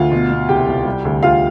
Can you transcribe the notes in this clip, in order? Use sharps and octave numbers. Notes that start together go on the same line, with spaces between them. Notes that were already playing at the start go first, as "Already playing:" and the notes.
Already playing: D2 F4
B2
B2
C2 G4 G5
C2
G3
D2
D2 F4 F5